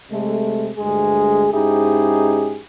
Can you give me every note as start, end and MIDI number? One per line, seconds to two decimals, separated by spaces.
0.11 0.70 48
0.11 0.70 56
0.11 0.70 57
0.78 1.48 38
0.78 1.48 43
0.78 1.48 56
0.78 1.48 68
1.53 2.59 44
1.53 2.59 61
1.53 2.59 63
1.53 2.59 64
1.53 2.59 67
1.53 2.59 68